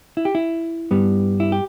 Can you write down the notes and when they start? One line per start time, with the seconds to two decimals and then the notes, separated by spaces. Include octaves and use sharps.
0.17 E4
0.25 G4
0.35 E4
0.91 G2 G3 B3
1.40 E4
1.52 G4